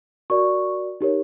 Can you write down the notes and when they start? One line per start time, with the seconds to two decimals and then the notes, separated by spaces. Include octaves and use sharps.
0.30 F#4 A#4 D5 C#6
1.01 D#4 G4 A#4 C#5